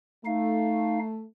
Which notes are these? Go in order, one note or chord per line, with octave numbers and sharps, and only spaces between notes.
A3 D#4 F5